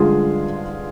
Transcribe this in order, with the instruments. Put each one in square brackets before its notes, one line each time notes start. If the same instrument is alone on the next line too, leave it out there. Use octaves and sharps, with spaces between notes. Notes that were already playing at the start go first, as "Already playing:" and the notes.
Already playing: [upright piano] G2 D3 F3 G#3 F4 G#4